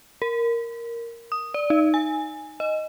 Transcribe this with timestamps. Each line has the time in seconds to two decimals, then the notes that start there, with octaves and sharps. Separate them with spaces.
0.22 A#4
1.32 D#6
1.54 D5
1.70 D#4
1.94 G#5
2.60 D#5